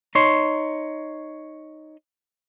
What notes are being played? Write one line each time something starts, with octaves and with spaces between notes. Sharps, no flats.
D#4 C#5 C6